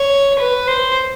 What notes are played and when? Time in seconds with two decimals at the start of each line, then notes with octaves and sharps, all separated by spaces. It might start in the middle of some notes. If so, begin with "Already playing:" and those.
Already playing: C#5
0.39 B4
0.67 C5